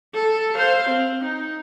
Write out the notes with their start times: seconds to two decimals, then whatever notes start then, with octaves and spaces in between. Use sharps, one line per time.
0.15 A4
0.54 C5 F5
0.88 C4
1.24 D#4